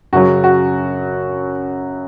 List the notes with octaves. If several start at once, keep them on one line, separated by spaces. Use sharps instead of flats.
F#2 C#3 F#3 F#4
F#4